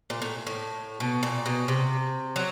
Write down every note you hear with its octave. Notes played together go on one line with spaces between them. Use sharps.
A#2
A2
A2
B2
A#2
B2
C3
F#3